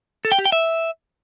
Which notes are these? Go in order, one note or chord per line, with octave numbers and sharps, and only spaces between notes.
A4
G5
G4
G5
E5